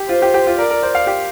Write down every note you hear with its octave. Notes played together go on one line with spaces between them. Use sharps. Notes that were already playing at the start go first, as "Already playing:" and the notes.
Already playing: G4
F4 C5
G4
G4
F4
A#4 D5
A#4
C5
F5
G4